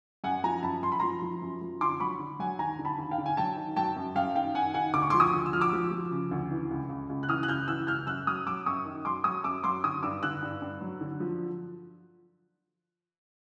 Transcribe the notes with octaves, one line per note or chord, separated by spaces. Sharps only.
F#2 F#5 G#5
F3 G#5 A#5
F#2 A5 B5
F#2 C6
B5
F3 A#5 C6
F3
F#2
F3
D3 C6 D6
F#3 B5 C#6
D3
F#3 F#5 G#5
D#2 G#5 A#5
D3
A5 B5
D#2
F5 G5
D3
G#5
F#3 G5 A5
D#3
F#3 G5 A5
F#2
F#2 F5 G5
D#3 F5 G5
D#3 F#5 G#5
D#3 F#5 G#5
D2 D6
C#6
C6 D6
F3
C#6 D#6
D2
E6
F3 F6
D6 E6
F3
F3
C#3
D2
E3
C#2
C#2
C#2
F#6
E3 D#6 F6
F#6
C#2 F6 G6
E3 E6 F#6
C#2 F6 G6
F#2 E6 F#6
F#3 D#6 F6
F#3 D6 E6
F#2 C#6 D#6
D#3
F#3 C6 D6
F#3 C#6 D#6
F#2 D6 E6
F#3 C6 D6
D3 C#6 D#6
G2 D6 E6
D3 E6 F#6
G2
G2
F#3
D3
F3